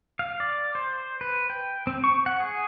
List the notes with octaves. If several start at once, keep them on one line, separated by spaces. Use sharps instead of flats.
F5
D5
C5
B4
G5
C4
C#6
F#5
G#4